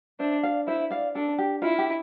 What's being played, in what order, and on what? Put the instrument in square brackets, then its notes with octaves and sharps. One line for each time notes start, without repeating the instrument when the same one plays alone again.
[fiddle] D4 [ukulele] C5 E5
[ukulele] D5 F5
[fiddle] E4 [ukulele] C5 E5
[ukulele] D5 F5
[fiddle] D4 [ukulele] A4
[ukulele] G4
[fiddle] E4 [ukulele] F4
[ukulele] G4